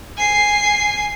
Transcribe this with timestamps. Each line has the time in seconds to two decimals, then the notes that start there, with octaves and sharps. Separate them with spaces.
0.17 G#5 C7